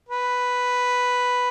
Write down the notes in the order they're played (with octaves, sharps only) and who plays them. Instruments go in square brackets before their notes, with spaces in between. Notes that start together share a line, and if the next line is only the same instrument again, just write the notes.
[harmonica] B4